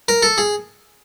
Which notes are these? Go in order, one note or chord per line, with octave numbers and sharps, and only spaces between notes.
A#4
A4
G#4